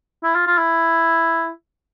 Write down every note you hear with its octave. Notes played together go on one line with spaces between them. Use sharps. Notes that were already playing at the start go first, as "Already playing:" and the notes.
E4
F4
F4
E4